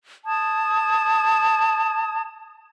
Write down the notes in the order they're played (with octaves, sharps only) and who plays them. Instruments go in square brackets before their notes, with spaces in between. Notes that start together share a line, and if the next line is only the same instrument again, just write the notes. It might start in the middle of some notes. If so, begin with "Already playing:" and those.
[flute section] A5 D#6 G#6